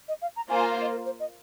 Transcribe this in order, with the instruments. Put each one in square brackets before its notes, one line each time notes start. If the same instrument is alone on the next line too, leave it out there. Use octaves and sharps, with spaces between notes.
[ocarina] D#5
F5
A#5
[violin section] A#3 F4 C5 [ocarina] G#5
[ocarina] G#5
F5
D#5
A#4
C5
D#5